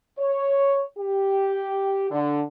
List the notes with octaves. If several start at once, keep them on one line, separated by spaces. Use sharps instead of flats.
C#5
G4
D3